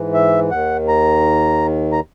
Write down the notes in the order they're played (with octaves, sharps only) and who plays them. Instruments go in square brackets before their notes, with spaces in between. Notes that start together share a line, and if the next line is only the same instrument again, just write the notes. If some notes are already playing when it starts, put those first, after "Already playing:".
Already playing: [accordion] G#2 E3
E5
D#2 D#3 F#5
A#5
A#5